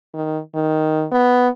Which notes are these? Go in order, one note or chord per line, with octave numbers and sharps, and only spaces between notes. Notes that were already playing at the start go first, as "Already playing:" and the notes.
D#3
D#3
B3